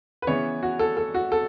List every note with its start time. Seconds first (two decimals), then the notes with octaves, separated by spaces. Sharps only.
0.22 B4
0.27 C#3 E3 B3 C#5
0.63 F#4
0.79 A4
0.97 A4
1.14 F#4
1.32 A4